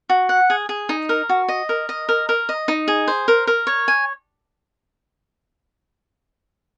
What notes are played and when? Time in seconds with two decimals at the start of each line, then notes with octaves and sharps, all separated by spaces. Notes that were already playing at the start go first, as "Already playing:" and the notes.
0.10 F#4
0.29 F#5
0.50 G#4
0.69 G#4
0.89 D#4
1.09 A#4
1.29 F#4
1.49 D#5
1.69 A#4
1.89 D#5
2.09 A#4
2.29 A#4
2.49 D#5
2.68 D#4
2.88 G#4
3.08 C5
3.28 A#4
3.47 A#4
3.67 C#5
3.88 G#5